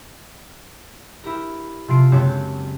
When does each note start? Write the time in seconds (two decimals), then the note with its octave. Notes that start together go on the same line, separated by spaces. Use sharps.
1.24 E4 G4 A#4
1.88 C3 F3 F4 C7 D7
2.11 F#1 G#3 C4 G4 C#5 D6